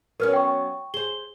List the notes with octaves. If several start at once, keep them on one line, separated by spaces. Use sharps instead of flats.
F#3 B3 C#4 A#4 B4 F6
G5 C#6
G#4 C5 G7